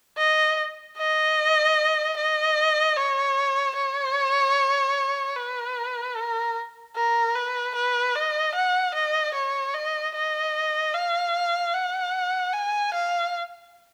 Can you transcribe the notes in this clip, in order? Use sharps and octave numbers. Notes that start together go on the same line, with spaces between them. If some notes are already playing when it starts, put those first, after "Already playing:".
D#5
D#5
D#5
C#5
C#5
B4
A#4
A#4
B4
B4
D#5
F#5
D#5
C#5
D#5
D#5
F5
F#5
G#5
F5